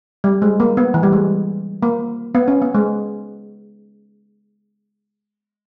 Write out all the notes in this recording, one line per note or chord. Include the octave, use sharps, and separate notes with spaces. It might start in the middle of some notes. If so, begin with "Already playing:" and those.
G3
G#3
A#3
B3
E3
G3
G#3
A#3
B3
C#4
B3
G#3